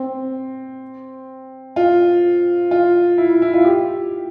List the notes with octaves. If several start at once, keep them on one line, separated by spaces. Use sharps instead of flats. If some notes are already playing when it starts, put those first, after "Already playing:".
Already playing: C4
F4
F4
E4
E4
E4
F4
G4